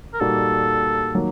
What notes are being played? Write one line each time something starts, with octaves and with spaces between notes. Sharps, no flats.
A#4
A#2 G3 A#3 D#4 F#4 A4
D#3 F#3 A#3